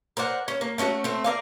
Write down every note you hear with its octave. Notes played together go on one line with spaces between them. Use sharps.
A#4 C5 D5 F#5
C#4
A#3
A3 C#4 D#4 F#4
A3 C4
A#4 D5 F5